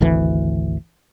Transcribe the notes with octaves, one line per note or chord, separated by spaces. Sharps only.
G#1 D2 E3